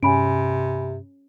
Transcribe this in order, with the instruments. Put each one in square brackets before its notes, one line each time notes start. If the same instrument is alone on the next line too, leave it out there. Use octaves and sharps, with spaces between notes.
[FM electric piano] G2 [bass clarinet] C3 [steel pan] C#4 [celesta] G#5 B5 D7